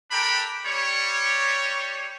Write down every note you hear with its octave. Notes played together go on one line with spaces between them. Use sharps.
D4 G4 A4 A#4 G5 B5
G3 C#5